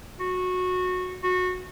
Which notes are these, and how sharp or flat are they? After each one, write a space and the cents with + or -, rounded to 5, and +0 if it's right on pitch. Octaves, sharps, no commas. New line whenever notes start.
F#4 -20
F#4 -25